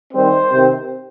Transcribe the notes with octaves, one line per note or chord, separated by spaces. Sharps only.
D#3 G3 C4 C5
C3 D#3 C4